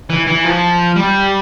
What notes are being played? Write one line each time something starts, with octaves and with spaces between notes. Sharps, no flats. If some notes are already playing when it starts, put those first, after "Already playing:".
E3
E3
F3
G3